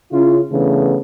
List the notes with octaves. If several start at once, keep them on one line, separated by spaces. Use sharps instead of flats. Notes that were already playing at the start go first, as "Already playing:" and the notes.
C#3 C#4 E4 F4
C#3 E3 A3 B3 D4